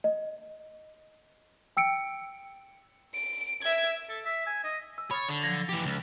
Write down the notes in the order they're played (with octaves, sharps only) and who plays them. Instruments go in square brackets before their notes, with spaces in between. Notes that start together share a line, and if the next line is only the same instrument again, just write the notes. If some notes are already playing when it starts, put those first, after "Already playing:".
[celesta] D#5
G5 E6 C#7 D7
[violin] D7
E5 G#6
[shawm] A4
E5
G#5
D#5
[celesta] E6
[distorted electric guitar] C#5 [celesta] B5 [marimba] D#6 F6 A6
[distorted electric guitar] D3
[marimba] F3 F#3 [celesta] A#6
[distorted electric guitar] E3 G4
C#2